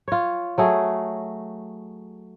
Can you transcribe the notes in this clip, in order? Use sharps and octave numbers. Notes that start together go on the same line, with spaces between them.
F4 C#5
F#3 A3 G#4